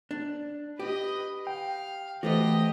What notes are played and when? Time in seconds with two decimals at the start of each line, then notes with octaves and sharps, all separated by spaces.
0.11 D4
0.80 G4 B4 D#5
1.47 F5 G5
2.23 E3 A3 F#4 G4 A4 B4 C5 D#5